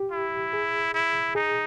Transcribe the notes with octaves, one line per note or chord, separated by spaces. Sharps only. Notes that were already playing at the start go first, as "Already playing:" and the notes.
Already playing: G4
E4
G#4
E4
D#4 G#4